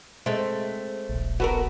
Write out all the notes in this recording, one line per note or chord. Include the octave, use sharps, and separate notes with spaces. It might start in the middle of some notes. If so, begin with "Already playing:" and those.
G#3 A3 C4
D#1 A#1
B3 F#4 A4 A#4